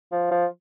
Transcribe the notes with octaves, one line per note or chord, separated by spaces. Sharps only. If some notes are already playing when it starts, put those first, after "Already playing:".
F3
F3